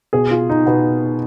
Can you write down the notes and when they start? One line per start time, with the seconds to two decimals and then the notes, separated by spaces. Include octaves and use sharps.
0.13 B2 G#4
0.31 F4
0.50 D#4
0.66 B2 B3